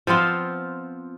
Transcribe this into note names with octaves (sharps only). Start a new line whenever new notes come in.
F3 B3 C4 F4